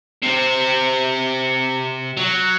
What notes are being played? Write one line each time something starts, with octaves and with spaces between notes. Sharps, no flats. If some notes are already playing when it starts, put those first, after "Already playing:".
C3 C4
F#3